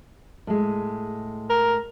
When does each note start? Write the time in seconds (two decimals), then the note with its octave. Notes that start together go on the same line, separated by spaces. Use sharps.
0.47 A2 G#3
1.50 A#4